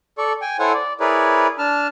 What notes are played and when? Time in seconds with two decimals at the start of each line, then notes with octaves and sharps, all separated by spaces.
0.18 A4 D5 C#6
0.42 G5 G#5
0.59 E4 A4 C5 C#5 F#5 G#5
0.73 D5
1.00 E4 G#4 A#4 B4 C#5 D5
1.59 D4 A5 F6